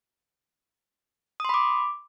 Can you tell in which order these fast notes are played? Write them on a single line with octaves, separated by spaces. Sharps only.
D#6 C6 B5 D6